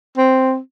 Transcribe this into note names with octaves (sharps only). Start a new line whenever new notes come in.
C4